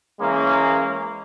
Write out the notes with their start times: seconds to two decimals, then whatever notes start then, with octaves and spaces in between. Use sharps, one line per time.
0.20 E3 G#3 A#3 C#4